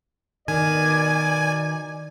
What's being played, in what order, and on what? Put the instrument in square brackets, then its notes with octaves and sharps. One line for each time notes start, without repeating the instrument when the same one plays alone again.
[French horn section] B2 D5 [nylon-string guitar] D#3 [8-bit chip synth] G#5